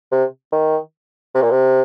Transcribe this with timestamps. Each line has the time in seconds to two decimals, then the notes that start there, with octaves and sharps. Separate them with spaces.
0.12 C3
0.52 D#3
1.35 C3
1.42 A#2
1.51 C3